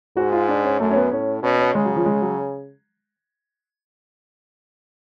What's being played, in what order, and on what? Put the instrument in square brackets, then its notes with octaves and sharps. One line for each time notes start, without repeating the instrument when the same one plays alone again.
[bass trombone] G#2 [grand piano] F#4
[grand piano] F4
D4
C#4
[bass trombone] F#2 [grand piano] A3
[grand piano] C#4
B3
[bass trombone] A2 [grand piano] C#4
[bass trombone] B2 [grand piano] C#4
[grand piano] C#4
[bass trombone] C#3 [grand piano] G#3
[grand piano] F#3
F3
G#3
F#3